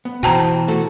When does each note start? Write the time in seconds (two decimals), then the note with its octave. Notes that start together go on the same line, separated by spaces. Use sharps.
0.05 B3
0.23 B2 E3 F#4 C5 G5 A5 A#5
0.68 A3 F#4 A4